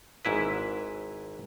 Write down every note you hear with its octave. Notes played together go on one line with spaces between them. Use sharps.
G#1 G#2 E4 B4